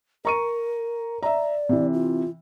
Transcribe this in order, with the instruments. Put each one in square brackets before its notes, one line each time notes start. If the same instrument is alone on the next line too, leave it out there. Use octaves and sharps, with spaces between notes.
[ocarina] A#4 [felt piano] A#5 C#6 D#7
[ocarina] D5 [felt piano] E5 A#5
[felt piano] C3 E3
[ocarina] F4